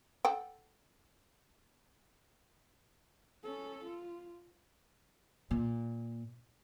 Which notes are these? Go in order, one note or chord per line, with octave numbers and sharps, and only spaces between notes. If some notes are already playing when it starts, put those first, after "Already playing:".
A4 F#5 G5
C#4 A4
F4
A#2